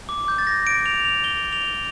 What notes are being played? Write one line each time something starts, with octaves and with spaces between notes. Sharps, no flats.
D6
G6
A6
A#6
D7
F7
F7
G7
F7